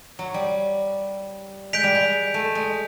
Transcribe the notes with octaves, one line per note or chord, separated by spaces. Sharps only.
F#3
G3
G#3 G6 B6 D7 F7
G3
G#3
A3
G#3